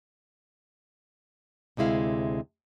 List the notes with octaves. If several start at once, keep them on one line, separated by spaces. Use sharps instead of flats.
D2 C3 G#3 E4 F5